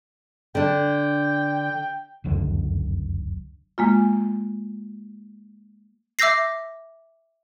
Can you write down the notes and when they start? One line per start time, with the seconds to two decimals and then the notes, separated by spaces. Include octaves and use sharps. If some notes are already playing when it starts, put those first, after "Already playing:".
0.55 D3 D4 G5
2.24 F1 C#2 F#2 D3
3.78 G#3 A#3 F4
6.19 E5 D6 E6 G6 A#6 C7